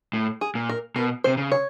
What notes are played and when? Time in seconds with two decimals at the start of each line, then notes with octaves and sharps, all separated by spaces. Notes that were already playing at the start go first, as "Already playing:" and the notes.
0.13 A2
0.41 G#4
0.55 A#2
0.69 A#4
0.96 B2 A#4
1.24 C3 C5
1.37 C#3
1.52 C#5